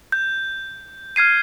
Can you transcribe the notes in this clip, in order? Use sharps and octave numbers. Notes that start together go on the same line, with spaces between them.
G6
F6 G#6 C7 D#7